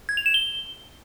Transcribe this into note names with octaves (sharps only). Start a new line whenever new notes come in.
G#6
F7
E7
G7